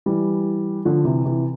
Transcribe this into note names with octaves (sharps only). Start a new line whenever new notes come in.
E3 G3
D3 F3
C3 E3
C3 E3